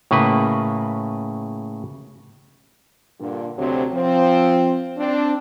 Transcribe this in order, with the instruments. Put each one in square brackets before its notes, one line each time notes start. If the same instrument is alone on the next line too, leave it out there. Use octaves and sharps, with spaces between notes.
[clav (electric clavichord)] A2 C#3 A#3 B4
[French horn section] G2 A#2 D3
D2 C3 F#3 C4
F3 C4
C4 D4